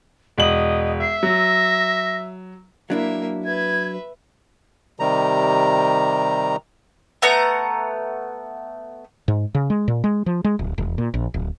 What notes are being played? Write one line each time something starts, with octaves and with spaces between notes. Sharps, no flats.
E1 D#5 F#7
E5 C7
F#3 A#6
F#3 A#3 D4 E4 E5
B4 E5 G#6
C3 D#3 G3 A#5
A3 B3 F#5 A#5
G#2
C#3
G#3
A#2
G#3
F3
G#3
D1
E1
A#2
A#1
D1